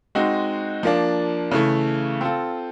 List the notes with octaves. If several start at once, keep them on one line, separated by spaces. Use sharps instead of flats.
G#3 C4 D#4 F#4
F3 A#3 D4
C#3 E3 A3
C4 F4 A4